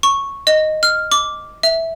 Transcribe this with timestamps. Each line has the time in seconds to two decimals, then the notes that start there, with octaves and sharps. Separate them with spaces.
0.03 C#6
0.47 D#5
0.83 F6
1.12 D6
1.63 E5